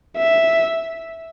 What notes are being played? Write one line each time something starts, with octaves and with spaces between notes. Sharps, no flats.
E5